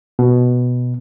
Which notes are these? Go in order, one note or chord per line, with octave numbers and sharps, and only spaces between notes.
B2